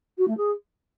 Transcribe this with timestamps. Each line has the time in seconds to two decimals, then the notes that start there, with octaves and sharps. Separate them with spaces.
0.18 F#4
0.27 A3
0.37 G#4